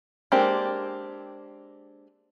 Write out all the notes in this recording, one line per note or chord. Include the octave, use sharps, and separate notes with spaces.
G#3 A#3 C4 D4 G4